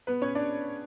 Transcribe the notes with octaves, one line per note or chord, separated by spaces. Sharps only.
B3 B4
C#4 C#5
D4 D5